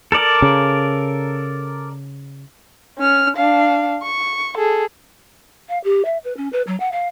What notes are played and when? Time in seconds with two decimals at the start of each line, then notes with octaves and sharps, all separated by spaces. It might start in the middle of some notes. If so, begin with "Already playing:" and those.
0.12 A4 A#4 D5
0.42 C#3
2.98 C#4 F6
3.37 D4 F5
4.02 C#6
4.58 G#4 A4
5.69 F5
5.84 G4
6.05 E5
6.24 B4
6.37 C#4
6.52 B4
6.67 F#3
6.80 F#5
6.92 F5